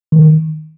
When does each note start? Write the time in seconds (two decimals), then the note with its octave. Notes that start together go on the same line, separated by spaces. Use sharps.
0.12 D#3